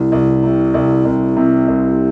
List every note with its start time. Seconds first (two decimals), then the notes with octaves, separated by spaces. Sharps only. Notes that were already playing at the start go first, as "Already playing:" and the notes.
Already playing: C2 E4
0.12 C2
0.43 C3
0.74 C2
1.05 C2
1.37 C3
1.68 C2